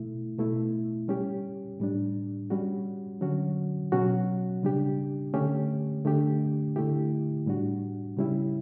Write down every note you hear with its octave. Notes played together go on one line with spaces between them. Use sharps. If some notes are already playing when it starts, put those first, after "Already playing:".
Already playing: B2 A3 E4
B2 A3 E4
G3 C#4 G4
A2 G3 D4
G3 C#4 F#4
D3 F#3 C#4 F#4
B2 F#3 C#4 F#4
C#3 G3 D4 G4
D3 A3 C#4 G4
D3 A3 D4 G4
D3 A3 E4 G4
A2 G3 D4 F#4
C#3 G3 C#4 E4 G4